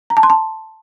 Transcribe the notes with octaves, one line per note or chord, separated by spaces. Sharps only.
A#5
A5
C6
A5